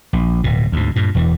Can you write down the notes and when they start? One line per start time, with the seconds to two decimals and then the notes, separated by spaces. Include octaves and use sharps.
0.13 A#1
0.44 D1 B2
0.72 D2 G#2
0.96 G2 A#2
1.15 E1 E2 E3